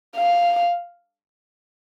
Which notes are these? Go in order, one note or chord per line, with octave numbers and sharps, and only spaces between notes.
F5